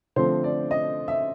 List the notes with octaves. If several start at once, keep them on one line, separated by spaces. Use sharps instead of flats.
D3 F3 A3 C4 C5
D5
D#5
E5